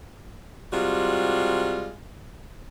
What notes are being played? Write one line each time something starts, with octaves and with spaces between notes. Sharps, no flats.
C3 G3 G#3 F4 F#4